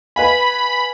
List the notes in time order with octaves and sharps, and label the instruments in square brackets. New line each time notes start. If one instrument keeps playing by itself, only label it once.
[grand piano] B4 F5 G#5 [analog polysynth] B5